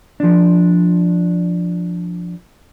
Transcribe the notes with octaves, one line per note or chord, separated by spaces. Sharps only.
F3 D4